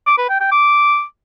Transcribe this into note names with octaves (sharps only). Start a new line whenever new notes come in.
D6
B4
G5
G5
D6